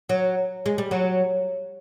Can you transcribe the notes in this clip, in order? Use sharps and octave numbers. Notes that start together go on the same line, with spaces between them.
F#3
G#3
G3
F#3